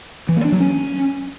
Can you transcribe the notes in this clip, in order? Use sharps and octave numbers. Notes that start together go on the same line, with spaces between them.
E3
A#3
D4
F#3
C#4